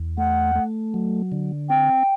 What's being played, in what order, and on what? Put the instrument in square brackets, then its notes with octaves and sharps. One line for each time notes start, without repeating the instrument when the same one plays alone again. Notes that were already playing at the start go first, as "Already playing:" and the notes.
Already playing: [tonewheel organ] E2
[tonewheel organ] A3 [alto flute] F#5
[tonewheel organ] A3
F#3
D3
[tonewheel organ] C4 [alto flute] G5